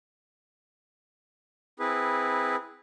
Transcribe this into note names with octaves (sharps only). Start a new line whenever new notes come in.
C4 E4 G#4 B4